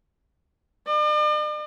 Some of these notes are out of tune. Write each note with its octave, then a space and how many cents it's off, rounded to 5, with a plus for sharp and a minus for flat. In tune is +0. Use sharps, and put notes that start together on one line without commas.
D5 +45